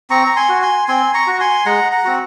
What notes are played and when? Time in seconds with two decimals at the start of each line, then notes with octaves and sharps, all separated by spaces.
0.10 C4 A#5 C#6
0.26 A#5
0.36 G#5 C6
0.49 F#4
0.62 G#5 C6
0.88 C4 G#5 C6
1.14 A#5 C#6
1.27 F#4
1.40 G#5 C6
1.66 G#3 F#5 A#5
1.92 F#5 A#5
2.05 C4 F#4